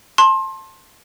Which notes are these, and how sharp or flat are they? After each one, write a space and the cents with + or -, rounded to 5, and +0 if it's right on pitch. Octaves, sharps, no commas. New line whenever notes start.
A5 +0 C6 +25